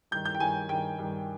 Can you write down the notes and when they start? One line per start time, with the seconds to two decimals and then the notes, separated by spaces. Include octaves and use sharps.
0.11 G2 D#3 G6
0.25 G6
0.34 G5
0.40 G2 D#3 G#5
0.69 G2 D#3 G5
0.98 G2 D#3